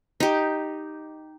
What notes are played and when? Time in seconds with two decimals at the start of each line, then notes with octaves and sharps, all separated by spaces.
0.20 D#4 G4